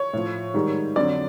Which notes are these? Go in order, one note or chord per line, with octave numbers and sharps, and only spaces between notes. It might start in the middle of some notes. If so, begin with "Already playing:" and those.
Already playing: C#5
A2 F3
G#2 D#3 G3
F2 D3 F#3 D5